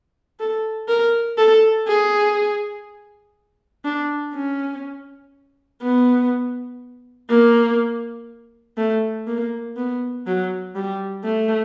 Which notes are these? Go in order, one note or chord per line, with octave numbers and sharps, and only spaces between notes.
A4
A#4
A4
G#4
D4
C#4
B3
A#3
A3
A#3
B3
F#3
G3
A3